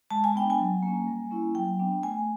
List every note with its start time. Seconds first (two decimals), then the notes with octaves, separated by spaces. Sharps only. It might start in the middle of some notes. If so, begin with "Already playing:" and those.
0.11 G#3 A5
0.24 G#5
0.35 B3 D4 G5
0.50 G#5
0.60 F#3
0.82 A#3 C#4
1.07 G3
1.31 A#3 C#4 E4
1.55 F#3 G5
1.80 B3 D4
2.03 A3 G#5